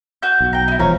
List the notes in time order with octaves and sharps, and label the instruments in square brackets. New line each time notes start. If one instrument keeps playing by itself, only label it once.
[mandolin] F#4 G6
[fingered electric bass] B1
[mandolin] G5 A#5
D#4 E4
[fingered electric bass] E1 E2 F3 [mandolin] C#5 F5 A#5